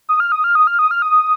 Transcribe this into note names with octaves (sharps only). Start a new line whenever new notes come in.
D#6
F6
D#6
F6
D#6
F6
D#6
F6
D#6